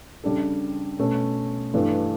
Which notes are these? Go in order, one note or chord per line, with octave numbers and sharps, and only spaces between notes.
C#3 G3 D4 A4
B2 A3 C#4
G2 E3 A3 D4